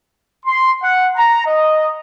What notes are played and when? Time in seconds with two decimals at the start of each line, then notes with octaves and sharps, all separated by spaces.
0.46 C6
0.83 F#5
1.17 A#5
1.46 D#5